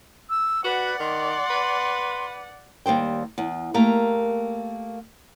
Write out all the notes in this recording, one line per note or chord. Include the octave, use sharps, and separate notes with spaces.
E6
F#4 B4 D5 F#5
D#3 C6
B4
D#2 G3 C5 G5
E2
A3 A#3 G4 A#4